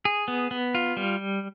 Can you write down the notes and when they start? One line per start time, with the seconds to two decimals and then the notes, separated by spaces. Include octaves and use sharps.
0.05 G#4
0.28 B3
0.51 B3
0.75 F4
0.97 G3